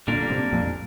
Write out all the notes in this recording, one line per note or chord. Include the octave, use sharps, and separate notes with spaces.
A#2 D3 G3 A#3 D4 A#4
G2 C3
F2 A#2